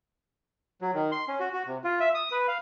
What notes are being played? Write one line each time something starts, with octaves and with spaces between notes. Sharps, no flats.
F#3
D#3
C6
C#4
F#4
F#4
C3
F4
E5
D#6
B4
F5